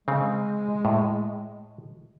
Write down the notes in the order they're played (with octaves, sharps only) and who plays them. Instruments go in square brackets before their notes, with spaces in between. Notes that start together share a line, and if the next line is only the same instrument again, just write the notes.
[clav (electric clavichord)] C#3 C4 [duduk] G#3
[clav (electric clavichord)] A2